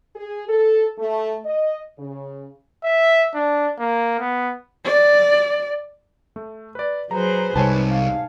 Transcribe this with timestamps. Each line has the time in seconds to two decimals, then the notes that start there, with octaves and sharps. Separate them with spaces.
0.15 G#4
0.49 A4
0.98 A3
1.45 D#5
1.98 C#3
2.84 E5
3.34 D4
3.79 A#3
4.19 B3
4.85 D5
6.36 A3
6.75 B4 D5
7.11 F#3 G#4 B4 C5 A#5
7.56 C2 G#2 C#5 G#5 A5
7.90 F5